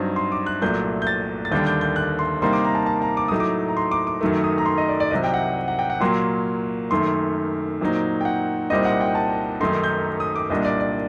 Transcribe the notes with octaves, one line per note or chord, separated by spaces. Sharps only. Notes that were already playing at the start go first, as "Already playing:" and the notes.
Already playing: G2 F#3 C4 D#4
C6
D6
F#6
C2 A#2 F#3 A3 G6
G6
A6
A6
D#2 D3 G3 D4 G6
G6
G6
F#6
C6
C3 G3 A#3 D#4 C6
D6
A#5
A5
A5
A#5
D6
A2 F#3 A3 D#4 D#6
D6
A#5
C6
D6
D6
F#2 D#3 F#3 A3
D#6
A#5
C6
D#5
D5
D5
C2 C3 F#3 D#5
G5
F#5
F#5
G5
F#5
A#2 F#3 A#3 C6
F#2 D#3 A3 C6
A#2 F#3 C4 D#4
G5
F#5
C2 A#2 G3 C4 D#4 D#5
F#5
G5
A5
F#2 D#3 F#3 A3 D#4 C6
G6
D#6
D6
C2 A#2 G3 D4 D#5
D5
D5